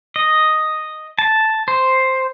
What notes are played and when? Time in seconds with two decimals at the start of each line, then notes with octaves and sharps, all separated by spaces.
0.16 D#5
1.19 A5
1.68 C5